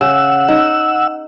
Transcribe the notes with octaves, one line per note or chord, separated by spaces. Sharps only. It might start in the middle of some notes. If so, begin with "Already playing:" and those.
C#3 F#5 E6
D#4